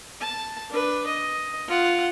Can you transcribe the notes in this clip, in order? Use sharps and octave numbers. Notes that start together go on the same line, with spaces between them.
A5
D4 B4
D#5
F4 F#5